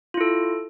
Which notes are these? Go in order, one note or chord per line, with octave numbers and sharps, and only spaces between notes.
E4 F4 A4